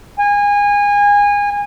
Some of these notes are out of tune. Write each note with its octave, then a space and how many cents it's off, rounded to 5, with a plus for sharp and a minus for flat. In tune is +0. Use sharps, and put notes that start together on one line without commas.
G#5 -25